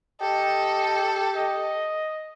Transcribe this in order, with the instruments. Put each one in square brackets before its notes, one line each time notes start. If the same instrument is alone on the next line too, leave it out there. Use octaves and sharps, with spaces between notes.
[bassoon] G4 [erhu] A4 [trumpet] D#5
[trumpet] D#5